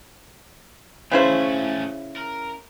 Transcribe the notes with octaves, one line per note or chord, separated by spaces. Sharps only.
C#3 A3 C#4 E4 C5
A#4